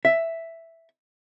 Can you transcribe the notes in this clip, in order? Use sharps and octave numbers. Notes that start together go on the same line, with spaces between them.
E5